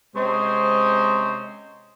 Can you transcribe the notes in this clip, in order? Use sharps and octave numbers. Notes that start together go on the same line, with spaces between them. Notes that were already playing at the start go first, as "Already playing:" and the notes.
C3 G#3 C4 C#4 C5 D#5